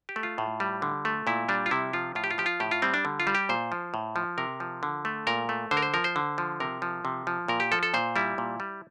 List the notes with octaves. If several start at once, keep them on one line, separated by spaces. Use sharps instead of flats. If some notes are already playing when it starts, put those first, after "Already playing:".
G4
A3
F4
A2
G3
D3
A3
A#2 E4
G3 D4
F4
C3 E4
F3 F4
A2 F4
G4
F4
F3 G4
F4
A2 G4
F4
G3 C4
D4
D3
F4
G3
G4
A#2 C5
F3
A2
F3
C3 A#4
F3
D3
A3
A#2 A#4
A3
D3 C5
A#4
C5
F3 A#4
C5
D3
F3
C3 A#4
F3
C3
F3
A#2 A#4
G4
F3 A4
A4
A#2 C5
G3 E4
A#2
G3